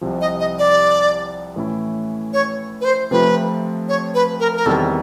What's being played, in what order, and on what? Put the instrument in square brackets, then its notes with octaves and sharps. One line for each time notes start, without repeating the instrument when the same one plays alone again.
[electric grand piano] C2 C3 F3
[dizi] D#5
D#5
D5
[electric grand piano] A2 E3 A3 C#4 E4
[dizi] C#5
B4
C5
[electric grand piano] C3 F3 A3 C4 F4 [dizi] B4
[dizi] C#5
B4
A#4
A#4
[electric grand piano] E2 C3 D#3 G3 [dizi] A4